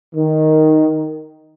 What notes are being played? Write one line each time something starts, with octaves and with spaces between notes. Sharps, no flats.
D#3